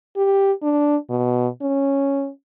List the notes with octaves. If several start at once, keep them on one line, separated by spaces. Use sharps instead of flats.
G4
D4
B2
C#4